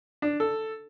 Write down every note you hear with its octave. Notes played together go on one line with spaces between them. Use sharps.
D4
A4